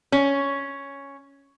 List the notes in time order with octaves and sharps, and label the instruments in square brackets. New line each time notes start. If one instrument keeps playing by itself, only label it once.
[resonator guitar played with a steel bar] C#4